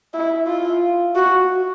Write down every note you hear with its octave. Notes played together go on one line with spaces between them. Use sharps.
E4
F4
F#4